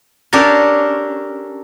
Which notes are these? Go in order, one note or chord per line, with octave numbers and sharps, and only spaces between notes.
C#4 D4 G4 A4 A#4